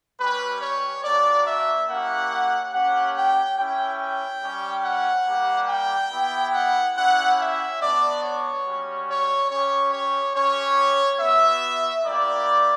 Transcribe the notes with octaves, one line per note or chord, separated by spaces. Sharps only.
G3 C#4 G4 B4
C#5
A#3 D4 F#4 D5
E5
A#3 C#4 E4 G4 F#5
A#3 C#4 G4 F#5
G5
C#4 E4 G4 G5
G5
G3 C#4 G4
F#5
G3 A#3 D4 G4
G5
B3 E4 G4
F#5
C#4 E4 G4 F#5
E5
B3 D4 F#4 D5
C#5
G3 C#4 F#4
C#5
C#4 G4 C#5
C#5
C#4 G4 C#5
B3 F#4 E5
A#3 E4 G4 D5